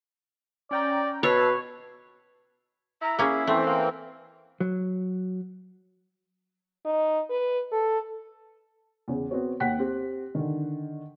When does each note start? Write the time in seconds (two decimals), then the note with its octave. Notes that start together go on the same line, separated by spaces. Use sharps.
0.71 C#4 D5 G5 A#5
1.23 B2 B4 C#5 A5 E6 C7
3.02 E4 A#5
3.19 A#3 C#4 G#4
3.47 E3 A3 C4 C5
3.66 A#3
4.60 F#3
6.85 D#4
7.30 B4
7.72 A4
9.08 E2 C#3
9.31 B3 C4 F#4 C#5
9.60 D#2 F#5 G5 F#6 B6
9.79 C4 G4
10.35 D3 D#3